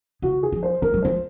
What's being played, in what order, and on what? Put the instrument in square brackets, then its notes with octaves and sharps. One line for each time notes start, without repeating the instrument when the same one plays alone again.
[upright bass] C#3 [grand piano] F#4
[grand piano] G#4
[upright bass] F3
[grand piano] C5
[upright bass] G#3 [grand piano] A#4
[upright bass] F#3
[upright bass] F3 [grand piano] C5